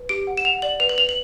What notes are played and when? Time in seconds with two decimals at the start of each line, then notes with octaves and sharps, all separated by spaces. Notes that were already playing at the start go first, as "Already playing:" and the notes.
Already playing: B4
0.09 G4 D7
0.27 F#5
0.37 E7
0.45 F#5 F7
0.62 D5 F#7
0.80 B4 F7
0.89 F#7
0.98 B4 F7
1.09 F#7